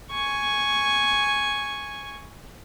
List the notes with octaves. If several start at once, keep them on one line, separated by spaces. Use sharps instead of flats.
G#5 C#6